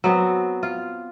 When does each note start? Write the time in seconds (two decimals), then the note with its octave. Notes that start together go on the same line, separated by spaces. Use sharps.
0.04 F#3 B3 C4
0.63 F4